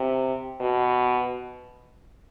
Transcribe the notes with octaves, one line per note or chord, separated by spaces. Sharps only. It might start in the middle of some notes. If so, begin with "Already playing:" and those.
Already playing: C3
B2